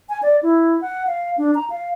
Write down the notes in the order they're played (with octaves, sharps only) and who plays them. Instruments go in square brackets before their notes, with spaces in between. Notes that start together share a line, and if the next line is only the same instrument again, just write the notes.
[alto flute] G#5
D5
E4
F#5
F5
D4
A#5
F5